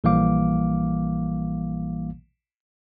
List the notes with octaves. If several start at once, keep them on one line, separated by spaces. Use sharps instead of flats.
A#1 E3 G3 A#3 F5 D6